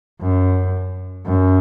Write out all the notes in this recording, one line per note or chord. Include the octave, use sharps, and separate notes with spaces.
F#2
F#2